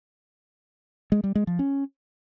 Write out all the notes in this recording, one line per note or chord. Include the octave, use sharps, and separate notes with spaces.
G#3
G3
G#3
F3
C#4